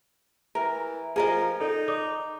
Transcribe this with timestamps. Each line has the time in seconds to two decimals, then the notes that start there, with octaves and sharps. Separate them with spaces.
0.55 E3 A#4
1.16 F3 G#4 A#4 D#5
1.60 D#4 A4 D5
1.88 D5 D6 D#6